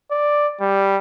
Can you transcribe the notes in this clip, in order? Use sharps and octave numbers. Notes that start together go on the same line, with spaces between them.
D5
G3